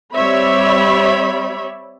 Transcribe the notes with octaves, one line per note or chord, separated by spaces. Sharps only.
G3 C4 C#5 D5 E5 B5